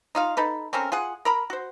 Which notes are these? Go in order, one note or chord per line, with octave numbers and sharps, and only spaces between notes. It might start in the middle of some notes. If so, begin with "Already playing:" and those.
D#4 F4 F5
D#4 A4 B4
C4 C#4 A4 A#4
F4 G#4 F#5
A#4 A#5 B5
F#4 C5